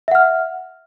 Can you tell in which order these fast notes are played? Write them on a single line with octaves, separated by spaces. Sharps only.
E5 F#5 F6